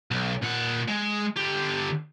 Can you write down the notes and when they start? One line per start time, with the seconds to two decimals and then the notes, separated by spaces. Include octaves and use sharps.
0.11 B1
0.42 A#2 F#5
0.88 G#3
1.36 D3 G4